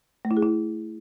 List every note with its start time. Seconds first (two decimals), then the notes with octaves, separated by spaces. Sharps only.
0.25 A3
0.31 E4
0.37 G#4
0.43 E4